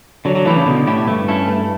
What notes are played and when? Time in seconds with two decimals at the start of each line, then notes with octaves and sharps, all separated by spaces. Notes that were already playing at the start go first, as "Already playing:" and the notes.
0.25 D3 F#3
0.35 F#3
0.45 E3 A3 E4 G4
0.56 C#3
0.66 B2 D3
0.87 A2 A3 E4 G4
1.08 G2 A3
1.28 C#4 E4 A4
1.48 A3